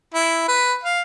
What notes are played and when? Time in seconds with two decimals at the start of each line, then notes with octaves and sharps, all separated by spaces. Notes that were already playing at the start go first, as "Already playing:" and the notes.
0.14 E4
0.48 B4
0.83 F5